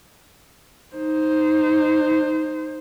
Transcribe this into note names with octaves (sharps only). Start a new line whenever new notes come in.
D#4 C5